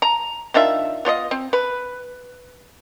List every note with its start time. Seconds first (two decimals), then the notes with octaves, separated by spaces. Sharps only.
0.02 A#5
0.54 D#3 D4 F4 E5
1.05 B3 F4 D5 D#5
1.31 C4
1.53 B4